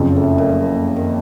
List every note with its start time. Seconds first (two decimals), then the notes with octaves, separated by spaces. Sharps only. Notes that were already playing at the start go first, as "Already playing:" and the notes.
Already playing: F#1 F2 C#3 F3
0.16 A2
0.38 A#2
0.62 A#2
0.96 D#3